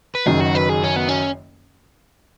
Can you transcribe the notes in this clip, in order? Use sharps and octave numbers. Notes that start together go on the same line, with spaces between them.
B4
F#1 F#2 D#3 F#3 G#4
F#4
B4
G#4
C#4
B3
C#4